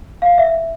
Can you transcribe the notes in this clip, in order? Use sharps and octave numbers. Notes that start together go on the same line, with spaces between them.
F5
E5